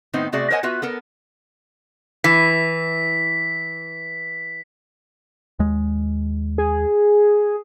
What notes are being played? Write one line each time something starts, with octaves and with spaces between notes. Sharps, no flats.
A2 D#3 B3 C4 D#4 C5
C3 A3 F#4 G#4 D5 E5
A#4 C5 C#5 D#5 F#5 G#5
B3 F4 F#4 B4 E5
B3 A4 A#4
E3 B6
D#2 G#3
G#4